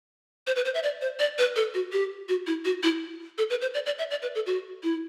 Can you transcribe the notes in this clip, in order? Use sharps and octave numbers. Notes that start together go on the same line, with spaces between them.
C5
B4
C5
E5
D5
C5
D5
B4
A4
F#4
G4
F#4
E4
F#4
E4
A4
B4
C5
D5
D5
E5
D5
B4
A4
F#4
E4